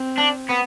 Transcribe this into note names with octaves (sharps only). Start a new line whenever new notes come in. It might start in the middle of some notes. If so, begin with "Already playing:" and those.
Already playing: C4
D4
B3